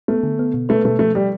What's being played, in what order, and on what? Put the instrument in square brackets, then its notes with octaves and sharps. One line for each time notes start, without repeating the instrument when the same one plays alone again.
[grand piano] A3 [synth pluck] B3
[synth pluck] D3
B3
B2
[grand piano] A3 [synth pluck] B4
[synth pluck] B2 [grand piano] A3
[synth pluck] F3 [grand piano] A3
[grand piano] G3